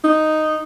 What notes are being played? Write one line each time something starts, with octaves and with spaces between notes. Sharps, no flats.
D#4